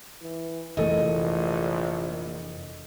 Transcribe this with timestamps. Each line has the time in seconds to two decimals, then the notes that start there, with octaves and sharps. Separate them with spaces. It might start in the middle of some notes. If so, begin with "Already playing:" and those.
0.21 E3
0.77 F1 A#1 E3 A3 A4 D#5